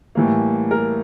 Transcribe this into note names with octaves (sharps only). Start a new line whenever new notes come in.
A2 E3 G3 A#3
A#4